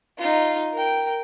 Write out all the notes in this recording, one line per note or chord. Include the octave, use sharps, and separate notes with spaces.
D#4 F4
A#4 G5